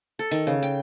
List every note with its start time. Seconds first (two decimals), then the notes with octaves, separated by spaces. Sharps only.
0.19 A4
0.31 D#3
0.47 C#3
0.62 G5